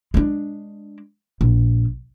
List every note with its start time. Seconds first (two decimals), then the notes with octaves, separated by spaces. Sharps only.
0.14 G#3 D4
1.41 A#1